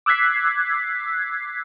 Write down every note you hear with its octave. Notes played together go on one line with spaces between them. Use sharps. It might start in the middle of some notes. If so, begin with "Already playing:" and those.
D6 E6 F#6 G#6 B6 C7